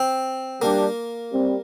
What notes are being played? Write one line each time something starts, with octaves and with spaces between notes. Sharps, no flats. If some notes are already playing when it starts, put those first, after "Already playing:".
Already playing: C4
G3 A#3 D4 G4
G3 C4